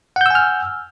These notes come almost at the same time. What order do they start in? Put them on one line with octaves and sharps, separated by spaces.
F#5 G6 E6 G#5 F6